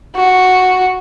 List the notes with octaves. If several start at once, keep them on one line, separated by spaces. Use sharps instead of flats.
F#4